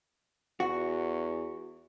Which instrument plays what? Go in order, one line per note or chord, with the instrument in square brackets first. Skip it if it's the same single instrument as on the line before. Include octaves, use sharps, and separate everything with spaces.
[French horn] E2 [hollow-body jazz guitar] F#4